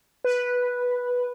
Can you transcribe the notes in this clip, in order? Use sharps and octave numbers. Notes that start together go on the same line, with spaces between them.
B4